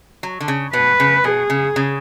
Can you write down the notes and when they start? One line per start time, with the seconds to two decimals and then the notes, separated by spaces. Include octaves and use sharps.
0.23 F#3
0.40 D3
0.48 C#3
0.73 B2 B4
1.00 C#3
1.24 B2 G#4
1.50 C#3
1.76 C#3